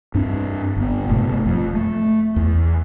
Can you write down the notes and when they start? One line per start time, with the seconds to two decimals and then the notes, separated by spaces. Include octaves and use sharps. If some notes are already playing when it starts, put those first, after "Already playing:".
0.15 G2 C4 D4
0.76 G1 B3
1.09 F1 G#2 B2 A3
1.46 F2
1.75 A3
2.36 E2